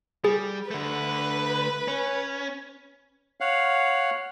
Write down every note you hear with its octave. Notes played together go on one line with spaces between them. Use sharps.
G3 G#4
D3 A3 B4
C#4
C#5 F5 F#5